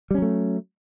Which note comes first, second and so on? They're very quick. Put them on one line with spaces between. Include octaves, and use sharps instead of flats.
G3 C#4 F#3 A3